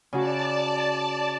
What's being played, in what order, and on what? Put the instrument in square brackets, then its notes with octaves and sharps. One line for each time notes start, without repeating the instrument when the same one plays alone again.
[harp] C#3 F#4 [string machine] D5 A5